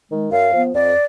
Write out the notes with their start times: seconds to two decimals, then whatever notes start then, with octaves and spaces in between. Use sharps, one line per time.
0.09 D#3 G#3
0.31 F#2 F5
0.53 F3 B3
0.74 F2 D5